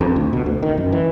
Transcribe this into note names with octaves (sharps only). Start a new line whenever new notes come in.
F2
D2
B2
D2
D#3
F#2
E3